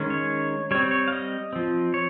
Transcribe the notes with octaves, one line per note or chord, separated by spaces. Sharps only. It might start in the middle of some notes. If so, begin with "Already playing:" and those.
Already playing: D#3 G#3 C#4
C#5
G3 C4 C#5
C#5
F5
D#5
F3 C4
C#5